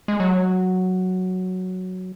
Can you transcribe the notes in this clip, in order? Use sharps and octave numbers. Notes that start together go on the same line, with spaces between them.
G#3
F#3